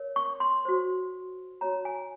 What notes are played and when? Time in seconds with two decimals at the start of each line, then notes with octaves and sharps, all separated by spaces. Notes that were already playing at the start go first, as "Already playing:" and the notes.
Already playing: A#4 C#5
0.16 C#6
0.40 C6
0.65 F#4 C5
1.61 D#4 F#4 C#5 A#5
1.85 G#5